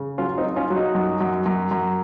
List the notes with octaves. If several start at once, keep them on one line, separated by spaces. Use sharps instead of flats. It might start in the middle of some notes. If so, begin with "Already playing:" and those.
Already playing: C#3
F#3 C#4 F4
C4 D#4
F#3
C#4 F4
F#3
D#4 F#4
F#2
F#2
F#2
F#2